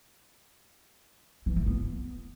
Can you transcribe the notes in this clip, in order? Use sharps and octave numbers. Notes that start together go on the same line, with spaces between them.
E3
A3
B3